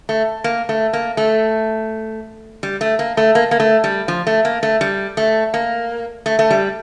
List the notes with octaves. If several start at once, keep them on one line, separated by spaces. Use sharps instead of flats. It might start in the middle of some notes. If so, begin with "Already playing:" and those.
A3
A#3
A3
A#3
A3
G3
A3
A#3
A3
A#3
A#3
A3
G3
F3
A3
A#3
A3
G3
A3
A#3
A3
A3
G3